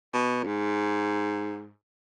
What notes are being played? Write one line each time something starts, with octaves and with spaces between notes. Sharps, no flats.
B2
F2
G#2